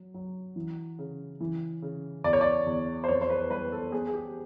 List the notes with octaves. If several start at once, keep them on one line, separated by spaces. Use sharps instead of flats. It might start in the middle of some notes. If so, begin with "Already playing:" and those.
Already playing: F#3
F#3
E3
C#3
E3
C#3
E2 D5
C#5
D5
E2
C5
F2 C#5
C5
B4
G3 B4
A4
B3 G#4
G#4
G4